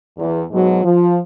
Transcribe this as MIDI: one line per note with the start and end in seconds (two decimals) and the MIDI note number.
0.17 0.42 40
0.51 0.82 44
0.51 0.82 47
0.51 0.82 54
0.84 1.18 53